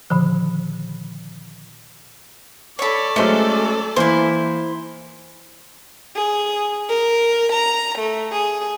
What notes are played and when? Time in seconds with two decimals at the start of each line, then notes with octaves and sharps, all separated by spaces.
0.10 A#2 D3 D#3 F3
2.79 A4 C#5 D5 B5
3.16 F#3 G#3 A3 C#4 C5
3.96 E3 A#3 E4 C5
6.15 G#4
6.87 A#4
7.50 A#5
7.97 A3
8.31 G#4